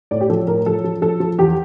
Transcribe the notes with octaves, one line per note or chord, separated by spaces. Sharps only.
A2 D5
G4
F3 A4
A2 A#4
F3 A4
F3
F3 A4
F3
E2 G4